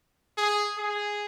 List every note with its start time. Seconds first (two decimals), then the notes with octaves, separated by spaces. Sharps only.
0.37 G#4
0.78 G#4